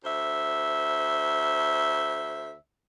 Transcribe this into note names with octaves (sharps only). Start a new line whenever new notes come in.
D2 C5 E5